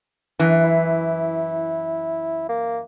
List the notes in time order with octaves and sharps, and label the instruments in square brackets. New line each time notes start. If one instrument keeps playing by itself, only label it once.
[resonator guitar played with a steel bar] F#2 E3
[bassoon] E4
A#3